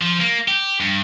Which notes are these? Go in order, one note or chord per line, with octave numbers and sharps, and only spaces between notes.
F3
A#3
G4
G2